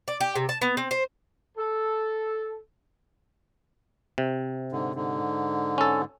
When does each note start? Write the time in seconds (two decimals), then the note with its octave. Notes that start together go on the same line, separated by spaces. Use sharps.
0.08 D5
0.21 G4
0.35 C3
0.49 A5
0.62 B3
0.77 C4
0.91 C5
1.58 A4
4.18 C3
4.72 G#2 D3
4.95 G#2 D3
5.78 C#4 A4